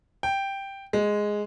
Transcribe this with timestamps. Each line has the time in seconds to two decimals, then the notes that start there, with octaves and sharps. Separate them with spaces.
0.23 G5
0.93 G#3